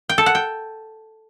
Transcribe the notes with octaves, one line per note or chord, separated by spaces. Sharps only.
G5
A4
F#5
G5